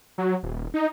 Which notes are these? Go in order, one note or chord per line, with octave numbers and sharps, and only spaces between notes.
F#3
D#1
D#4